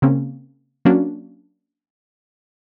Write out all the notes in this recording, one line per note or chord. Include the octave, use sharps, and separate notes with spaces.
C#3 A#3 C4 C#4
F#3 A#3 C#4 D4 F#4